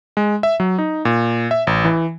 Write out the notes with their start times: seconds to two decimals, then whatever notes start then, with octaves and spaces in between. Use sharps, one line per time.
0.17 G#3
0.43 E5
0.60 F#3
0.78 D#4
1.05 A#2
1.51 E5
1.67 A1
1.85 E3